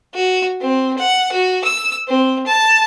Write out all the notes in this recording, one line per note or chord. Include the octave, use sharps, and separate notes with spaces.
F#4
C4
F#5
F#4
E6
C4
A5